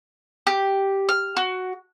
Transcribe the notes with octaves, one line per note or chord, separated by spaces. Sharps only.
G4
F6
F#4